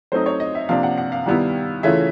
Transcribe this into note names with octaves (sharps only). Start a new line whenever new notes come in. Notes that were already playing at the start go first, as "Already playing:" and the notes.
F#3 A3 C4 D#4 C5
C#5
D#5
E5
C3 F3 A#3 D4 F5
F#5
F#5
F5
D#3 G3 B3 E4
C#3 E3 A3 C#4 F4 E5